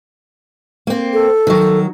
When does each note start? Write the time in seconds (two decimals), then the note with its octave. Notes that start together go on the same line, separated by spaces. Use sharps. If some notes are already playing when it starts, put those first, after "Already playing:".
0.87 A#3 C4
1.13 A4
1.47 D#3 F#3